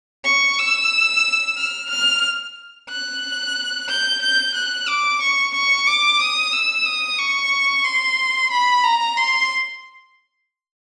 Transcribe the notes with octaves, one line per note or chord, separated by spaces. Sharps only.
C#6
E6
F6
F6
F#6
G6
G6
F#6
D6
C#6
C#6
D6
D#6
E6
D#6
C#6
C6
B5
A#5
C6